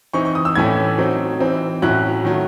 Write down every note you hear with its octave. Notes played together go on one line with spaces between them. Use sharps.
E3 C4 D#4 C#6
C#6
D#6
E6
A2 E3 A3 C#4 E4 G#6
F#3 C4 D#4
E3 C4 D#4
A2 F#3 C#4 E4 F#6
D#3 F#3 A3